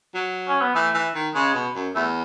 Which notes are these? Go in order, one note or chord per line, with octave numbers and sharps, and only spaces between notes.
F#3
C#4
B3
E3 A3
E3
D#3
C#3 G#3
B2
F#2
E2 A3